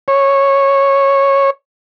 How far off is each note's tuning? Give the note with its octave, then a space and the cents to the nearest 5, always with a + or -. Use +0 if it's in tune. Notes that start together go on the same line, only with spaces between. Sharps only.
C#5 -10